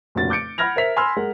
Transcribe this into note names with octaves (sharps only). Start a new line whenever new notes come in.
F1 A#2 C#3 F#4 A6
D6 G6 A6 C#7 D7
F#5 B5 F6 G#6 A#6 F7
A#4 C5 E5 B6 F7
G#5 B5 C6 E6 F6 G#6
G#3 A#4 F#5